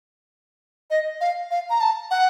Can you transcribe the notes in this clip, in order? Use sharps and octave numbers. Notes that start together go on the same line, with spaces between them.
D#5
F5
F5
A#5
A5
F#5